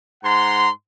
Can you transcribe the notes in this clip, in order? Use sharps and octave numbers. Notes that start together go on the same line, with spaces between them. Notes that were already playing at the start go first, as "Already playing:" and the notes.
G#2 F#5 A#5 C6